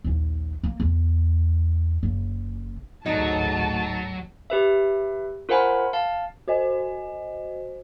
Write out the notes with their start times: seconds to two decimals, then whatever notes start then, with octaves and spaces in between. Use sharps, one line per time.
0.04 A#1 D#2
0.63 A#3
0.80 E2
2.03 F#1
3.06 A1 D2 G#2 F#3 D#4 A5
4.50 G4 B4 E5
5.49 F4 A#4 C5 F#5 G#5 B5
5.93 F5 A5
6.48 F#4 C5 D#5 G#5